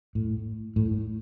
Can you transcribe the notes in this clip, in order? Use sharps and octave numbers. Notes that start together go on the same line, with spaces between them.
A2
A2